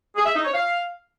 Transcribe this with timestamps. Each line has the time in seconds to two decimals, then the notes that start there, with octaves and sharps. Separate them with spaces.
0.16 G#4
0.26 E5
0.35 D#4
0.45 C#5
0.54 F5